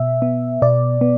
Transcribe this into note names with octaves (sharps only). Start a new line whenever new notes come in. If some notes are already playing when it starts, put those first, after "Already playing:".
Already playing: B2 E5
B3
B2 D5
B3